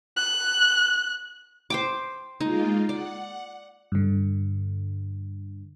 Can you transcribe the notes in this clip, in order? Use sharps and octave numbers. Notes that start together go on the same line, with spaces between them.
F#6
C5 G5 D6
G#3 A#3 D#4 F4
D5 F#5
G2 D3